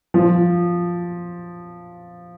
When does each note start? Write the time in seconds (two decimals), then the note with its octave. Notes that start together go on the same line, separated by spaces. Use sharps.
0.14 F3